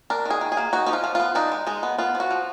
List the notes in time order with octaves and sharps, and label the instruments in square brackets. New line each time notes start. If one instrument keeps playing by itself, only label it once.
[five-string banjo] D4 A#4
D#3 G#4
D#3
G#4
A#3
D#4 F#4
F3 D#4
F4
F3
B3 F4
D4 D#4
G#3
G#3 D#4
B3
B3 F4
F3
F#4
F3